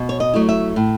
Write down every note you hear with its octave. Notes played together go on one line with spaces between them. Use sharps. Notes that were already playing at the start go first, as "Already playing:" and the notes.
Already playing: B2
C#5
D#5
F#3 A3 E4
E5
A2